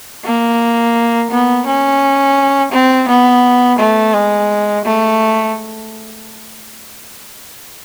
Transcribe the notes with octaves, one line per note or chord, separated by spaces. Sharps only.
A#3
B3
C#4
C4
B3
A3
G#3
A3